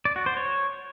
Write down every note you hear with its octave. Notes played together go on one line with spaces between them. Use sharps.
D5
F#4
C5
C#5